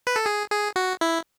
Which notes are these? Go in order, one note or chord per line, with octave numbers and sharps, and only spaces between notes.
B4
A4
G#4
G#4
F#4
E4